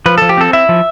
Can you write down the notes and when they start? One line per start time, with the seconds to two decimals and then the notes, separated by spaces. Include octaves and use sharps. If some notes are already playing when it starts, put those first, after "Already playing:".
0.06 F3 B4
0.18 F3 A4
0.29 G4
0.37 C4 A4
0.53 E4 E5
0.69 F3